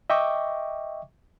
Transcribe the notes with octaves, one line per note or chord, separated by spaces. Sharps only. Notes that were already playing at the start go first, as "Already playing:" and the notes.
D#5 E5 G5 C#6 D6